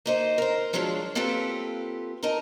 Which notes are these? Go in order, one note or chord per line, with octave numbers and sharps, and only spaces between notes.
A#3 D#4 C5
A#4 C5
F3 F#3 G#3 C#4 D4 F4
A#3 C4 F4 G4 A4 B4
D#4 A#4 A5 A#5